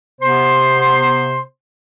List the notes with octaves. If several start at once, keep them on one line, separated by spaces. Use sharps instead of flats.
C3 B3 C5 C6